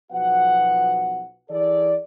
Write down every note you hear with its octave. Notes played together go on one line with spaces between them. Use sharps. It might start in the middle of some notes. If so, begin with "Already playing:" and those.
B1 F3 B3 F#4 F#5
E3 E4 G#4 A4 D5